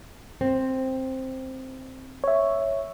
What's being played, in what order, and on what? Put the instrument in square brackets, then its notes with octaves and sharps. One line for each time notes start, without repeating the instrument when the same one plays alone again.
[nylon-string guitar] C4
[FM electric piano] C#5 E5